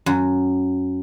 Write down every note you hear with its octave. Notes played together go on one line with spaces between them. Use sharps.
F#2